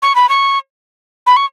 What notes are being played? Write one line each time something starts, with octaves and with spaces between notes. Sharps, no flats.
C#6
B5
C#6
B5
C#6